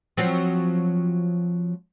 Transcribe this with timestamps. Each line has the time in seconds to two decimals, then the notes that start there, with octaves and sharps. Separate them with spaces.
0.17 F3 F#3 C4